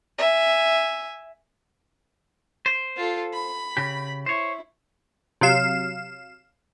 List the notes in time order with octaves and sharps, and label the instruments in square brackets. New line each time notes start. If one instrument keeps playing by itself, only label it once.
[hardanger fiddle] E5 G#5
[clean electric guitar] C5
[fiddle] F4 A4
B5
[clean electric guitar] C#3 G4
[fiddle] E4 [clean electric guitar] C5 C#5
[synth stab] C3 F#3 F5 E7